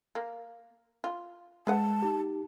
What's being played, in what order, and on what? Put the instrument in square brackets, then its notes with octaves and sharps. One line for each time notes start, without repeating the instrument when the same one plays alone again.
[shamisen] A#3
F4
[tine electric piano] G#3 [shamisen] G#4 B4 F#5 [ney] A5
[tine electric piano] D#4 G4